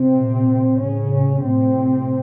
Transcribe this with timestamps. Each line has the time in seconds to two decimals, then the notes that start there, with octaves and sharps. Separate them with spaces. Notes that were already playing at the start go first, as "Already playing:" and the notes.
Already playing: C3 C4
0.15 A#2
0.79 A2 C#3 C#4
1.43 A2 C3 C4